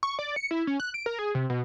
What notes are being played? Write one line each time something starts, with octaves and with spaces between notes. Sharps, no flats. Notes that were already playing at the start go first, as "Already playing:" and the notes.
C#6
D5
C#7
E4
C#4
F#6
D7
A#4
G#4
C3
B2